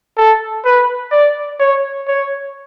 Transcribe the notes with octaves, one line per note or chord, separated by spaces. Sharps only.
A4
B4
D5
C#5
C#5